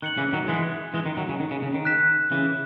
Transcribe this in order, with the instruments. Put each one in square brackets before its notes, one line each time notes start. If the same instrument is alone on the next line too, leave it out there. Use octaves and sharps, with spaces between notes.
[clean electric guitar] D#3 [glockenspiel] F#6 C#7 F#7
[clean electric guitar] C#3 E3
D#3 F#3
E3 G#3
E3 G#3
D#3
D#3 F#3
C#3
D#3
C#3
C#3
D#3
[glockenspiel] F#6 B6 E7
[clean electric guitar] C#3 E3